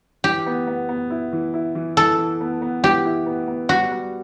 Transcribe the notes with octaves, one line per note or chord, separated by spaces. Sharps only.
E3 G4
B3
B3
B3
E4
E3
E4
E3
E3 A4
E3
B3
B3
E3 G4
E4
B3
B3
G3 F#4
G3